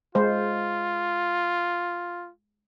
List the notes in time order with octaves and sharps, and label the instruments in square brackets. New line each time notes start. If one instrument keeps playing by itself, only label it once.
[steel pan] G#3 C5 [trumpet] F4